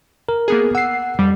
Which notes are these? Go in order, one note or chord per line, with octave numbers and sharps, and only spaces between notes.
A#4
A#3 B3 G#4
F#5 E6 C7
F2 G3